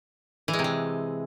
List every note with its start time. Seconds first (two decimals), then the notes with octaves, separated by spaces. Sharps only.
0.48 E3
0.53 G#3
0.59 C3
0.64 G#3